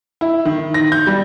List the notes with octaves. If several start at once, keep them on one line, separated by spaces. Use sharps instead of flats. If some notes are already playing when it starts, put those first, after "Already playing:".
E4
D#3
A#6
G6
G3